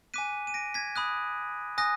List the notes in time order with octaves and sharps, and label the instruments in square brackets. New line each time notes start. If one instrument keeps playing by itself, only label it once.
[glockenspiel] G#5 D6 F#6 B6 D#7
D#7
A#6 D7
G#6 B6
B5 D#6 F#6
G#5 D#6 F#6 A#6